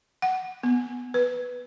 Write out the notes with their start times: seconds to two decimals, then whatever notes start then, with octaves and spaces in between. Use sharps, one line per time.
0.22 F#5
0.63 B3
1.14 B4